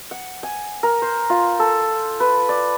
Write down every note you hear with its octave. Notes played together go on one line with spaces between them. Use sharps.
F#5
G#5
A#4
C5
F4
A4
B4
D5